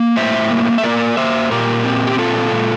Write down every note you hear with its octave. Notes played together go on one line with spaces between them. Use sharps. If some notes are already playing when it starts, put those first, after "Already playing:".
Already playing: A#3
A2 C5 E5
A#3
E5
A#3 A#4 D5
A#3 C5 E5
A#2 G4 A#4
C4
G4
A#2 F4 A4
A#2